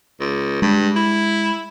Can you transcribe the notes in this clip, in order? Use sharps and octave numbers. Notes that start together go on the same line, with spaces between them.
C#2
G2 G#3
E4